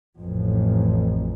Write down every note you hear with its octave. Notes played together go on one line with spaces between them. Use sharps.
A1 F2